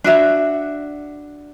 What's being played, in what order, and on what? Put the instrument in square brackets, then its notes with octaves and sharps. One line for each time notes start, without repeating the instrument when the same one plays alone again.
[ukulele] D4 F#4 E5